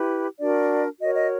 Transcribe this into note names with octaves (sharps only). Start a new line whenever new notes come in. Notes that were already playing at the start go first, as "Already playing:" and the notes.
Already playing: E4 G4 B4
D4 F#4 A#4 D5
F#4 A#4 C#5 D#5
D#5